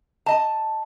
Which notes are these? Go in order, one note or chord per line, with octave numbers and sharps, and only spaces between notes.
D#5 A5